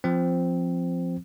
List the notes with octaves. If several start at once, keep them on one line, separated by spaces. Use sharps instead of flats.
F3 C4